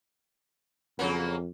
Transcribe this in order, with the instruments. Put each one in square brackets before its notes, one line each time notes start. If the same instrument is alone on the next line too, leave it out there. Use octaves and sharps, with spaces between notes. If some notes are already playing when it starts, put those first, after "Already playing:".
[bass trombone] F2 [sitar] C#3 F#3 A#3